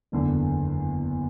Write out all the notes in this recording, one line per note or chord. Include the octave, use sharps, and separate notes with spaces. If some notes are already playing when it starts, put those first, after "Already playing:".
F#1 E2 D3